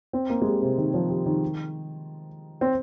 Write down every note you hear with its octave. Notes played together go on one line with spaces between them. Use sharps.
C4
A#3
G#3
G3
C3
D#3
F3
G3
D#3
C4